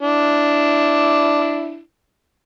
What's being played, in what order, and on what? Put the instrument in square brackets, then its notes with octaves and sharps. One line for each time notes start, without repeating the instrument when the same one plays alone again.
[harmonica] D4 E4